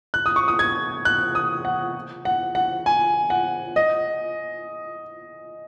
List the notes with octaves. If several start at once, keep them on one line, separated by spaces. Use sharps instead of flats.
F#6
D#6
C#6
D#6
G#6
F#6
D#6
F#5
F#5
F#5
G#5
F#5
D#5